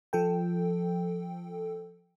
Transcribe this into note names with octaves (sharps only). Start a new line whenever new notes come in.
F3 A4 G5